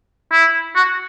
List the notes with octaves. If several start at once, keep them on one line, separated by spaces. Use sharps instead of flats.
E4
F#4